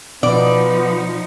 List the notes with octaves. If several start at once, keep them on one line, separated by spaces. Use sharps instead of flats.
B2 F3 B3 D#4 D5